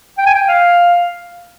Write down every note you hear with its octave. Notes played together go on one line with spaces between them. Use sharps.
G5
G#5
G5
F5